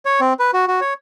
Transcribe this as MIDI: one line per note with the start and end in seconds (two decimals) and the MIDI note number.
0.05 0.20 73
0.21 0.33 60
0.39 0.51 71
0.53 0.65 66
0.68 0.80 66
0.81 0.94 73